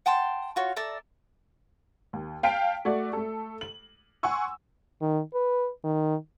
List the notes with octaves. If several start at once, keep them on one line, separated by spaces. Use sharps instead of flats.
F#5 G5 A5 C6
F4 F#4 C#5
A4 D5 E5 A#5
D#2
F5 G5 A5 B6 D7
A3 F#4 D5
A3 A4
F#7
F#5 G#5 C6 C#6 E6
D#3
B4
D#3